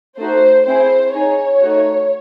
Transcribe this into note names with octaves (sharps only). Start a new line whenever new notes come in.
A3 D#4 F#4 C5
C4 E4 G#4 C5
D#4 G#4 C#5
A3 D#4 F#4